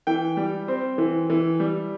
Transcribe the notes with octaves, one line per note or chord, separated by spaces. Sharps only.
E3 G5
G3
C4
E3
E3
G3